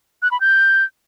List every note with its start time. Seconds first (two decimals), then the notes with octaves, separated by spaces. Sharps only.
0.22 F#6
0.31 B5
0.41 G6